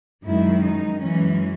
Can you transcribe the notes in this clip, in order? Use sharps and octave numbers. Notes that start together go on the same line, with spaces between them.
F#2 D#3 G#3 E4
D#4
F#2 E3 G#3 C#4